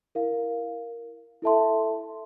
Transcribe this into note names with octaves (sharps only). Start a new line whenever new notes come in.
E4 A#4 F5
E4 A4 E5 A5 C6